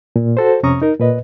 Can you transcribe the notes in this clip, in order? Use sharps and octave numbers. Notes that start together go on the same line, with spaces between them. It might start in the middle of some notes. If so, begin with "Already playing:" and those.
A#2
F#4 A4 C5
F2 C3 C#4 A#5 C#6 D#6
D#4 A#4
A#2 B4 D#5